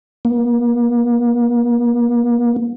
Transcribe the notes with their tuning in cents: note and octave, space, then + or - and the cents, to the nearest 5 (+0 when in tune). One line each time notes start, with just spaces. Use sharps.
A#3 +40